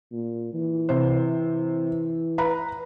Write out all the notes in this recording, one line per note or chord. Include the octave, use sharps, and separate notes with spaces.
A#2
E3
C3 C5
B4 A#5 B5